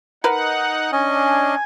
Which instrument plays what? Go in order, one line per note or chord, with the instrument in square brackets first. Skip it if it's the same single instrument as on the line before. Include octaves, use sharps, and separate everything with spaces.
[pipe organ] D#4 F#5 [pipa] A#4 B4
[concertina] C#4 D#5 [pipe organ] D4 [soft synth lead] G#5